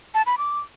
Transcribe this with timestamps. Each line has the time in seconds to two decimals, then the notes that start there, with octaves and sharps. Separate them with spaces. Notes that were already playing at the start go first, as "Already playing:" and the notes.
0.14 A5
0.26 B5
0.38 D6